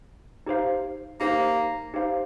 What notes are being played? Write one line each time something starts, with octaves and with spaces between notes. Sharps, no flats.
D#4 G4 C5 F5
A#3 D#4 G4 C5 F5
D#4 G4 C5 F5